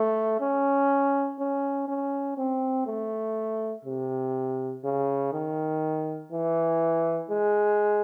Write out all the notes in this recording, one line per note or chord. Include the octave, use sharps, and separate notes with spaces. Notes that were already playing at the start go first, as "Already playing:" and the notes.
Already playing: A3
C#4
C#4
C#4
C4
A3
C3
C#3
D#3
E3
G#3